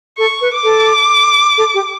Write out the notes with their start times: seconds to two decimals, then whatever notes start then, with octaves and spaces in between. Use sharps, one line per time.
0.18 A4 C#6
0.41 B4
0.53 D6
0.64 A4
1.58 A4
1.74 G4